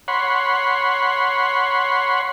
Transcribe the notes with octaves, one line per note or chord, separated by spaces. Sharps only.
C#5 F#5 B5 C6